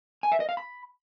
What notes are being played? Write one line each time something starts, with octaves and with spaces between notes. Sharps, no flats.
G#5
E5
D#5
F5
B5